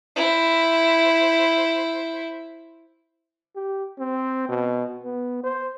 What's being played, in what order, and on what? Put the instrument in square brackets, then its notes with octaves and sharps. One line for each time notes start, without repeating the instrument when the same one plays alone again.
[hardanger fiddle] E4 C5
[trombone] G4
C4
B2
B3
C5